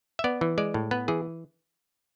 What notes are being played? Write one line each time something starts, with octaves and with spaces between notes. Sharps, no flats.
E5
B3 D5
E3
G#3 D5
A2
B3 B4
E3 G#4